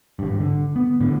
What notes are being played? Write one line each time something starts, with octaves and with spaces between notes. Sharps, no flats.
G#1 G2
D3
B3
G#1 A2 D3